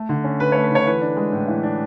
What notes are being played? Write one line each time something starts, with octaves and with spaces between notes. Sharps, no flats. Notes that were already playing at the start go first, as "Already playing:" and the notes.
Already playing: A3
D3
C#4
D3 B4
C#5
A3
B4
D3 C#5
E3 B4
D4
G#3
A2
E3
D4